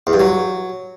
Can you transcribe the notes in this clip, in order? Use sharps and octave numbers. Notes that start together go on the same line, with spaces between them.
E2
G2
F#3